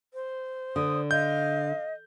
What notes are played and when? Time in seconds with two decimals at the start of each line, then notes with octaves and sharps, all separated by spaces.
0.14 C5
0.76 D3 D#6
1.11 D#5 F5 G6